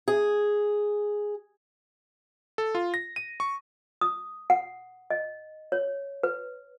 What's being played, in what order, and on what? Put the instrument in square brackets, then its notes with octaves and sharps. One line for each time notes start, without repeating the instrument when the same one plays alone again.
[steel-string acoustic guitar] G#4
[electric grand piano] A4
F4
A#6
D#7
C#6
[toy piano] D#6
F#5
D#5
C#5
B4